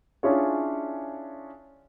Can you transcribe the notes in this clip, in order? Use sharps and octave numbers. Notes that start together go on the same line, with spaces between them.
C#4 D4 E4 F4 G#4 C#5